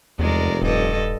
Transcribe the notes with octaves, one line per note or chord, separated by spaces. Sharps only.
F1 E2 G#3 A#4 D5
D#1 G2 A4 D#5